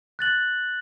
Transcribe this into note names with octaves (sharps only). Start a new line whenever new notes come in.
F#6 A6 F#7